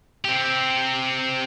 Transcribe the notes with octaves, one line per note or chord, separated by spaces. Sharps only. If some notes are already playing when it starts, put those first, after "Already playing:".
C4 G4